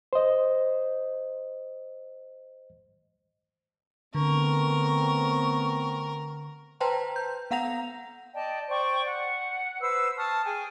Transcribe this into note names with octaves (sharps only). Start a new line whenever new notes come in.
C5 D#5
D3 A3 B3 C4 A#4 C#6
B4 C5 G5 A5 A#5 C6
G6
B3 F5 F#5 A#5 A#6 F7
D5 D#5 G5 A5
C5 D5 G5 C#6
F#5
B4 C5 E6
A5 C#6 D#6 F6
G#4 G5 G#5